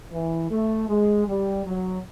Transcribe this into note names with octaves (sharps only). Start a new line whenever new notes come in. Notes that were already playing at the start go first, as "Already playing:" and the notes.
E3
A3
G#3
G3
F#3